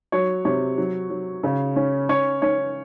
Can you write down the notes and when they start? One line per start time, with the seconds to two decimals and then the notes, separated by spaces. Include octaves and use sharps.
0.12 F#3 C#5
0.45 C3 C#5
0.78 F#3
1.10 F#3
1.43 C#3
1.76 C#4
2.09 C#4 C#5
2.42 C#4 C#5